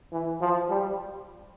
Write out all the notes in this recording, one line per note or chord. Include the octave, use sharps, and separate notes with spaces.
E3
F3
G3